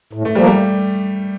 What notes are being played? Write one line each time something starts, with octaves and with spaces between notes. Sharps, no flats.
A2
A3
F3 G3 A#3
G3